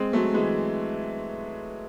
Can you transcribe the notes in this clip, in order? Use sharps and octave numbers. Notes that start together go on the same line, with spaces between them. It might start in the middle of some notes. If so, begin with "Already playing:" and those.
Already playing: G#3 C4
F#3 A3
E3 G#3